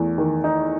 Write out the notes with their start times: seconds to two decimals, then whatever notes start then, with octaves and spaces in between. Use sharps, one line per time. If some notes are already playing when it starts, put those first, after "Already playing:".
Already playing: E2 A3
0.18 D#3
0.44 D#4